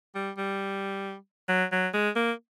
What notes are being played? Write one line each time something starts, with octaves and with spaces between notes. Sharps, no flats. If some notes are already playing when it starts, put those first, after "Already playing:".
G3
G3
F#3
F#3
G#3
A#3